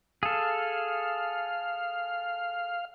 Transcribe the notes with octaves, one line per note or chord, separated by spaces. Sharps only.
G#4 A4 F5